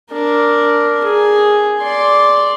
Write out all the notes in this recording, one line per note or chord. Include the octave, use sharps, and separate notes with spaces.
D4 A#4
G#4
D5 C6